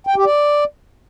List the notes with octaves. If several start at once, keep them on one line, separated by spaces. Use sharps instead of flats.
G5
G4
D5